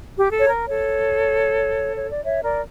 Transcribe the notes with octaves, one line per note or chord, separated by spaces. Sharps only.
G4
A4
C#5
A#4
A4 C#5
C#5
D5
C#5 E5
A#4 D5